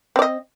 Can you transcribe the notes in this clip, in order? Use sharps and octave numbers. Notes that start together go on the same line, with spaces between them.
C4 D5 D#5